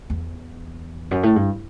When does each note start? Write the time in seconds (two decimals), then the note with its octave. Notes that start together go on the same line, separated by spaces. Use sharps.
0.10 E2
1.11 F#2
1.23 A2
1.36 G2